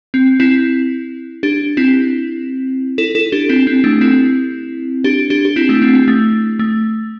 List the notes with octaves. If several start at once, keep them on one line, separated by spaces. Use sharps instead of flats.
C4
C4 E4
D4 G4
C4 E4
E4 A4
E4 A4
D4 G4
C4 E4
C4
A3 D4
C4 E4
D4 G4
D4 G4
G4
C4 E4
A3 D4
C4
C4
A3
A3